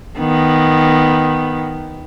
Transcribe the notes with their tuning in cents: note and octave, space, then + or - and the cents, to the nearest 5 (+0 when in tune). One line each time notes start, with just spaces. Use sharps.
D#3 +0 B3 +0